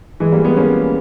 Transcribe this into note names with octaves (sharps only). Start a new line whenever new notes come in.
E3 G#3
G3 A#3
G#3 B3
A#3 C#4